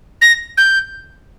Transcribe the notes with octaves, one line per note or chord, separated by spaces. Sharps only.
A#6
G6